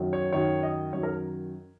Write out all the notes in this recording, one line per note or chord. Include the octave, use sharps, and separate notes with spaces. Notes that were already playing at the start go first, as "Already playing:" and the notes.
Already playing: F#2 D#3 F#3
C#5
F#2 D#3 F#3 C#5
D#5
F#2 D#3 F#3 C#5
A#4